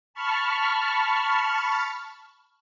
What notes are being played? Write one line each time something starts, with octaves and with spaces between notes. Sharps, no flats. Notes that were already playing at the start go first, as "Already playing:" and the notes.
A5 B5 C#6 F6